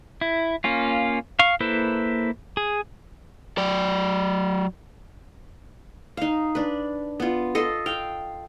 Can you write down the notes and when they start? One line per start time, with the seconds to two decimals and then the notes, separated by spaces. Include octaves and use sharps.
0.21 E4
0.64 A#3 C#4 F4
1.39 F5 C#6
1.60 A#3 E4 A4 B4 C5
2.57 G#4
3.58 F#3 D5
6.17 D#4 F5
6.55 D4 B4
7.20 B3 F4
7.55 A4 D#5 C6
7.86 F5 G5